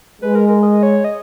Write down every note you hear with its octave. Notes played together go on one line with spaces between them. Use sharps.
G#3 B4
A#4
A#4
D#5
C#5
D#5